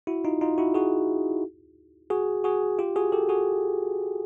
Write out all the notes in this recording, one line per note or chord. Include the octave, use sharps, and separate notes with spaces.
E4 F#4
D#4 F4
D#4 F4
E4 F#4
F#4 G#4
F#4 G#4
F#4 G#4
F4 G4
F#4 G#4
G4 A4
F#4 G#4